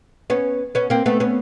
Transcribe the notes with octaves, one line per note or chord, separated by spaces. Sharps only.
B3 C#4
B3 C#4
A#3 C4
A3 B3
B3 C#4